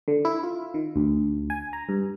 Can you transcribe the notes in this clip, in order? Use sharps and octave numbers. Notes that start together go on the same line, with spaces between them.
D3
E4
F4
D#3
D2
G#5
A#5
G2